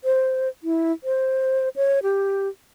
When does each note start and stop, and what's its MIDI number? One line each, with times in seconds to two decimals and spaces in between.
0.04 0.48 72
0.64 0.92 64
1.04 1.69 72
1.76 1.99 73
2.03 2.48 67